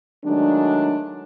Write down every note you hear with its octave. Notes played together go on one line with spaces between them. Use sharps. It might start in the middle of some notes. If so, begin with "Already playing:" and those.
D#3 F#3 G#3 A3 D4